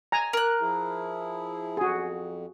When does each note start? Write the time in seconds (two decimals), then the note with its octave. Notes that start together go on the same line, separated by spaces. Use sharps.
0.12 G#5 A#5
0.33 A#4 F#6
0.61 F3 E4 G#4
1.77 F2 F#4 G#4